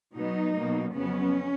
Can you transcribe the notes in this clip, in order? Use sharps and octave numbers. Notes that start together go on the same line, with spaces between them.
B2 F#3 B3 D#4
B2 F#3 A#3
F2 C#3 F#3 B3 C#4